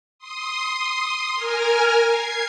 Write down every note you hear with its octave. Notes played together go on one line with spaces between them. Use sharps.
C6 D#6
A#4 G#5 F6
G#6 C7